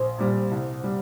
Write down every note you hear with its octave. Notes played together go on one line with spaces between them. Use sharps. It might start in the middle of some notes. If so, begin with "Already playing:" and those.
Already playing: A#1 C5
A#2 G3
C2
G3